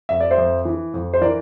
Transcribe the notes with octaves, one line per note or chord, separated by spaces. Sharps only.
F2 E5
D5
C5 E5
F2
E3
F2
C5
E3 A#4 D5